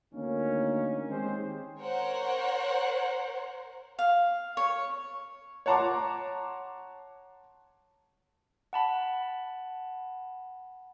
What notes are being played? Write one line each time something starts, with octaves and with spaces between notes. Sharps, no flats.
D2 D#3 A#3 C#4
D#3 G#3 C4 G4 G#4 C5
A#4 C5 C#5 F#5
F5
C#5
C#5 F#5 A5 A#5 C6 D6
F#5 A5 B5